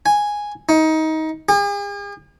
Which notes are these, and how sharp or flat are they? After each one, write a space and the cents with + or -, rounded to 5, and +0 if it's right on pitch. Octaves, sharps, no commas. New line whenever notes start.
G#5 -5
D#4 +20
G#4 -45